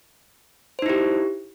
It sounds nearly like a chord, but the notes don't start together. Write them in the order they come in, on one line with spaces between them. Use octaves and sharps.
C5 D#4 E4 G4